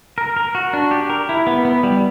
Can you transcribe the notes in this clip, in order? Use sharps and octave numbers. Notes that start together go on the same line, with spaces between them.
A#4
A#4
F#4
D4
G4
A#4
E4
B3
B3
G3